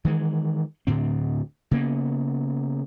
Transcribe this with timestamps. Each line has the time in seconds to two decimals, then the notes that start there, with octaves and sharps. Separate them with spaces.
0.05 D#3 E3 G#3
0.87 D2 A2 D3 C4
1.71 C#3 A#3 B3